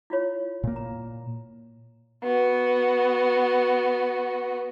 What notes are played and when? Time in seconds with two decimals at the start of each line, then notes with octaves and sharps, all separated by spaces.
0.10 E4 F4 C#5
0.64 A#2 A#3
0.76 A#5
2.23 B3 F#4